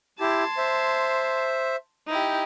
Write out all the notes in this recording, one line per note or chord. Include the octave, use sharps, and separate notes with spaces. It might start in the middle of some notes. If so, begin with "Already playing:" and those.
E4 G4 A5 C6 G#6
C5 E5
D#4 E4 G4